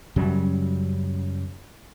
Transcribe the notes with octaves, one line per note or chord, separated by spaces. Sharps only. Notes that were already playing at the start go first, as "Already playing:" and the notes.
F#2 C#3 F#3 G3